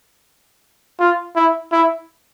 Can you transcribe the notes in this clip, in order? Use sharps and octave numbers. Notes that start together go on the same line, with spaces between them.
F4
E4
E4